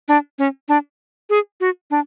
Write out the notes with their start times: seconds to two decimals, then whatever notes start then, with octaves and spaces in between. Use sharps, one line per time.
0.08 D4
0.39 C#4
0.68 D4
1.30 G#4
1.61 F#4
1.91 D4